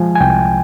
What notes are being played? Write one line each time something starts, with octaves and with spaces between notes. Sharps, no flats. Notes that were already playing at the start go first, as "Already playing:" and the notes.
Already playing: F3 G#3 G#5
G#5
C2 G5